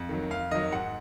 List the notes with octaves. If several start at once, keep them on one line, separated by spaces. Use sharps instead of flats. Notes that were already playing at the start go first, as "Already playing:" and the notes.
Already playing: F2
D#3 F#3
F2 F5
D#3 F#3 D#5
G#2 F#5